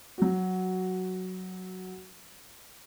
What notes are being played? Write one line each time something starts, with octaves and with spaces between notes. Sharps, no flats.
F#3 F#4